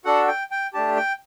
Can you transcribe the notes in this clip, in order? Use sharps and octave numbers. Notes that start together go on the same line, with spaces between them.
D4 F#4 A4 F#5
G5
G5
A3 D4 G4 A5
G5